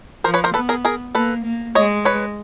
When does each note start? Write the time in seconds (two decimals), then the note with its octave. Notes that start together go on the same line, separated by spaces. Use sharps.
0.24 F3 A#4 C5
0.34 B4 C#5
0.44 A#4 C5
0.54 B3 A4 B4
0.69 G#4 A#4
0.85 G#4 A#4
1.15 A#3 A4 B4
1.45 A#3
1.75 G#3 C#5 D#5
2.05 B4 C#5